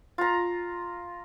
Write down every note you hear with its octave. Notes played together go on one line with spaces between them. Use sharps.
F4 A#5